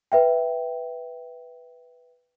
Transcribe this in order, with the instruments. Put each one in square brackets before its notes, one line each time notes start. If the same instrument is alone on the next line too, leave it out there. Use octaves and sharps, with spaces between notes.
[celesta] B4 E5 G5